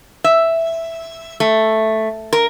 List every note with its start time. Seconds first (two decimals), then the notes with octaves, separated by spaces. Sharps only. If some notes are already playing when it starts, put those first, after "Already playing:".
0.24 E5
1.40 A3
2.33 A#4